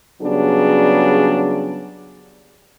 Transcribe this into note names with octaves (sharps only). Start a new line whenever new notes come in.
C#3 F#3 G3 B3 D4 G#4